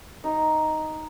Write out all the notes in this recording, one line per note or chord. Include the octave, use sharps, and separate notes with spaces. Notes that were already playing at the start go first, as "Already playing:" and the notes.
D#4